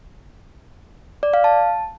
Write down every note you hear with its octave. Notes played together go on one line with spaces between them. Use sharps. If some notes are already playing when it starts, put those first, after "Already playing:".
D5
F5
A5